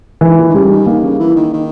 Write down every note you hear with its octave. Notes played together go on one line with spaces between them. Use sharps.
G#2 E3
A#2
D#3
C#3 G3
D#3
D#3 A#3
C#3
E3
D#3
D#3